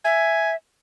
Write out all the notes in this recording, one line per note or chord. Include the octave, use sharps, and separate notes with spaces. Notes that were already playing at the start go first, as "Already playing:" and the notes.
E5 G#5